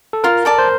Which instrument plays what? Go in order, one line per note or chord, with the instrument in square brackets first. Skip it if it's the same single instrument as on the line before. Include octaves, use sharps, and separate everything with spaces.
[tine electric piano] A4
[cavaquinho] F4 [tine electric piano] A#4
[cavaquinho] A4 D5 A5
[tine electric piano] C5